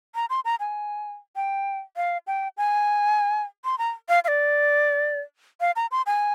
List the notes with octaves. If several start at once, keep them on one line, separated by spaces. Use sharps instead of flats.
A#5
C6
A#5
G#5
G5
F5
G5
G#5
C6
A#5
F5
F5
D5
F5
A#5
C6
G#5